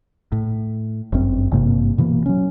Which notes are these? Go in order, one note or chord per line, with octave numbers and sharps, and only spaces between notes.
A2
G1 F#2 C4
G#1 G2 C3 A#3
B2 E3 A#3
F#3 C#4